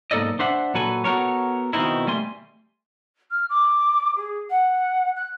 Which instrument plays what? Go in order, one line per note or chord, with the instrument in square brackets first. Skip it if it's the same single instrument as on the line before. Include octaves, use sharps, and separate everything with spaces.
[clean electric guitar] B1 G#2 A#3 A4 D5 D#5
D4 C5 E5 F#5
A#2 F#3 A4 B4 G#5
B3 F#4 A4 A#4 C#5
B2 D#3 A3 C4 D#4 E4
G3 A3 G#5 C6
[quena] F6
D6
G#4
F#5
F#6